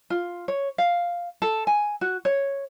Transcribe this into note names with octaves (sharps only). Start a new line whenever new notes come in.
F4
C#5
F5
A4
G#5
F#4
C#5